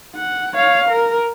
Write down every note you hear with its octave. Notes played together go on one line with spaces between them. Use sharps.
F#5
C#5 F5
A#4